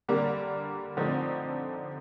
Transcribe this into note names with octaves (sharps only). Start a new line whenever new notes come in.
D3 G3 A#3
D3 F3 A3 C4 D#4